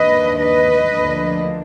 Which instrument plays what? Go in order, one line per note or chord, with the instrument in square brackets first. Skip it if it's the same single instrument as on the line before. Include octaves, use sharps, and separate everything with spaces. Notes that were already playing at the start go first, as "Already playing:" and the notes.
Already playing: [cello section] D#2 D#3 A#3 D4 B4 D#5
B4 D#5
D2 D3 F3 A#3 D4